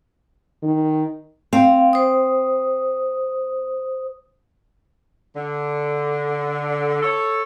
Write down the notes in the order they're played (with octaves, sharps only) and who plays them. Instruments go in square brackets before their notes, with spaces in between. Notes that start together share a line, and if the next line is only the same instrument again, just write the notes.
[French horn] D#3
[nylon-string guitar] C4 [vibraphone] F5
[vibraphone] C5 D#6
[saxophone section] D3
A4 C#5